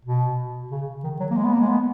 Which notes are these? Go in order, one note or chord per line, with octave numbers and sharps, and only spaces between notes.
B2
C#3
D#3
F#3
A#3
G#3
B3
A#3
G#3
B3